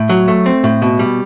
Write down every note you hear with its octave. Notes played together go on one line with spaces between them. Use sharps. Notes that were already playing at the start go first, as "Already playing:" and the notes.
Already playing: A2
F#3
A3
C4
A2
B2
G3